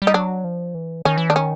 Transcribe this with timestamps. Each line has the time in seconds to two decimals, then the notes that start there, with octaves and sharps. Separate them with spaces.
0.02 G3
0.07 D#4
0.14 F#3 D4
0.44 F3
0.74 E3
1.05 D#3 C#4
1.18 E3
1.29 D#3 D4
1.36 C#4